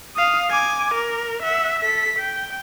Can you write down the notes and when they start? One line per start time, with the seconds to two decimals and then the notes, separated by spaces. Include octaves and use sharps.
0.16 F5 D#6
0.51 G#5 D6
0.94 A#4
1.43 E5 F#5
1.79 A4 B6
2.19 G5